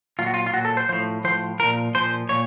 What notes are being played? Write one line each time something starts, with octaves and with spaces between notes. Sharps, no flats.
A#2 F#3 F4
F#4
F4
F4
A#2 F#3 F#4
A4
C5
A2 F3 C5
A2 F3 C5
A#2 F3 A#4
A#2 F3 C5
A#2 C#5